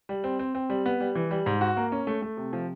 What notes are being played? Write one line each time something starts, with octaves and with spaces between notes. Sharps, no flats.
G3
C4
C4
C4
G3
B3
G3
E3
G3
G#2
F#4
A#3
C#4
A3
A3
C3
F3